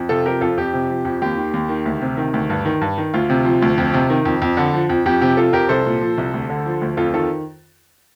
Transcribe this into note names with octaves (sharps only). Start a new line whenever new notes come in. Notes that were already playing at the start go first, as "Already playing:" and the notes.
Already playing: F2
C3 F4 A4
F3 G4 A#4
F2 F4 A4
F2 G4
C3
F3
F2
D#2 G4
D#3
D#2
D#3
D2
C3
D#3
D2
G2
D#3
G2
D#3
D2 F4
C3
F3
D2
F2
C3
D#3
F2
F2
D3
F3
F2
F2 G4
C3 G4
F3 F4 A4
F2 G4 A#4
C2 A4 C5
A#2
F3
C2
D2
D3
F3
D2
F2 F4 A4
D#3 F4 A4